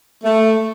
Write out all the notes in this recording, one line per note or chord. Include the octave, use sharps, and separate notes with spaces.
A3